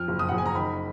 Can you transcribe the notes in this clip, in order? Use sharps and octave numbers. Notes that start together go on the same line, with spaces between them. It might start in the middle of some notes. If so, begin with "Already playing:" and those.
Already playing: F2 F6
F#1
D#6
F#1 F#5
G#5
A#5
D#3 B5